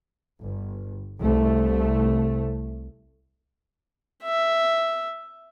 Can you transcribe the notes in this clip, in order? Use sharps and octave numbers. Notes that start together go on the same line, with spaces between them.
G1
C2 A3
E5